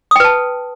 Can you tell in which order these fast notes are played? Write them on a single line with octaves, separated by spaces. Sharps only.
D#6 G5 B4 A5